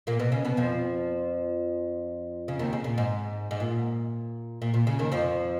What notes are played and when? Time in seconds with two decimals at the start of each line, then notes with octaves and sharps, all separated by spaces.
0.07 A#2 A#3
0.20 B2 B3
0.32 C#3 C#4
0.45 B2 B3
0.57 F2 F3
2.48 C#3
2.59 D#2 D#3
2.73 C#3
2.84 A#2
2.98 G#2
3.51 G#2
3.60 A#2
4.62 A#2
4.74 A#2
4.87 C#3
4.99 D#2 D#3
5.12 F2 F3